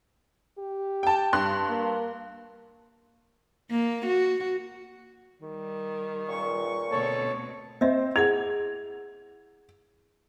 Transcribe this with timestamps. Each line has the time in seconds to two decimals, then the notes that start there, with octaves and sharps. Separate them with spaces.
0.59 G4
1.03 G5 A5
1.33 G2 C6 F#6
1.70 A#3
3.71 A#3
4.06 F#4
5.42 D#3 G3
6.28 C#2 A#2 C#6
6.91 D2 B2 C4 A4 C#5
7.81 C4 C5 D#5 E5
8.16 E4 G#4 F#5 G#6 F7